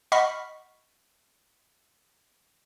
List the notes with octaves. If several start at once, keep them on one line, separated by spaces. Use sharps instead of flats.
D#5 F#5 B5 C#6 F6 B6